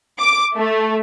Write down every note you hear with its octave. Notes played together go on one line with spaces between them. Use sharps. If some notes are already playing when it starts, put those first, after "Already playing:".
D6
A3